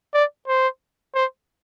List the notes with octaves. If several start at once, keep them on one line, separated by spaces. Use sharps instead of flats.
D5
C5
C5